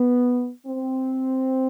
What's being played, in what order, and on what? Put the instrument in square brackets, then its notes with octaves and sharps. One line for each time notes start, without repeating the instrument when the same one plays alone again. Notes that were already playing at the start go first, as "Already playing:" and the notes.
Already playing: [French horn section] B3
C4